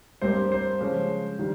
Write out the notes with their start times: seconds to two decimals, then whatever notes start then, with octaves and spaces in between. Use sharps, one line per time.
0.21 G2 G3 C4 G4 A#4 C5
0.52 C5
0.80 C#3 F3 G#3 C#4
1.39 D#3 G3